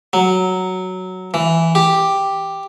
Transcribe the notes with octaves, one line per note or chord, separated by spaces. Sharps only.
F#3
E3
G4